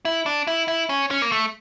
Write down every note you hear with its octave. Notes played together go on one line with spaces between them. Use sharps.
E4
D4
E4
E4
C#4
C#4
A#3
A3